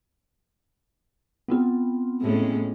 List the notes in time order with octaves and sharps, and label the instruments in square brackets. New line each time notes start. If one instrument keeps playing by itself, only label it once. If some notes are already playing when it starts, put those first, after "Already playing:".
[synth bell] B3 C4 F4
[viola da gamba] A2 G#3 C#4